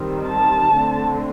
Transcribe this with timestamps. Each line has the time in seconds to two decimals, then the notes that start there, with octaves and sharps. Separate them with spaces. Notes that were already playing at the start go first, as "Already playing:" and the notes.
Already playing: D#3 G3 C4
0.26 A5
0.75 D3 A3 C4